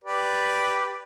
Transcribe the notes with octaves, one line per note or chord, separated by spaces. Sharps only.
G4 B4 D5